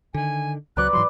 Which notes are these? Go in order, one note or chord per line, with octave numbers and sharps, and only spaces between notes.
D3 D#3 G#5
C#2 F#3 B4 D5 F#6
G#2 E3 F#3 C6